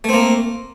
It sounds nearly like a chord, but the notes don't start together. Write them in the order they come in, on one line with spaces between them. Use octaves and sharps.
A3 C4 A#3